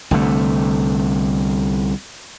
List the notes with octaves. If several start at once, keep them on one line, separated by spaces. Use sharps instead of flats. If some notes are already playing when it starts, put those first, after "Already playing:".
C2 D3 A3